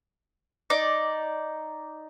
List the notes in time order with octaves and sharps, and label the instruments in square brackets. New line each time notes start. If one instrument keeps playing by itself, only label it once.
[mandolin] D#4 D5